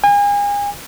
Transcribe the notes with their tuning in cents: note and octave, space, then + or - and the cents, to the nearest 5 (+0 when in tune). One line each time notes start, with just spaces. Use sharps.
G#5 -35